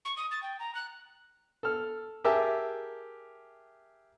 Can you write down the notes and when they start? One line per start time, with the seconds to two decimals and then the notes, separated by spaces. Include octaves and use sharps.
0.05 C#6
0.17 D#6
0.31 A6
0.43 G5
0.59 A#5
0.75 F#6
1.63 A4 F6
2.24 G4 G#4 A#4 E5 A5 E6